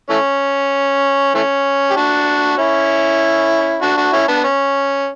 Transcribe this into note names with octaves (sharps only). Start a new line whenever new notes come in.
E3 A3 C#4
E3 A3 C#4
G4
D4 F#4
C#4 E4
D4 F#4
D4 F#4
C#4 E4
B3 D4
C#4